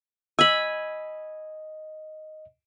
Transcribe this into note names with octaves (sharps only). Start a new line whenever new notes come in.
D#5 G#5 B5 E6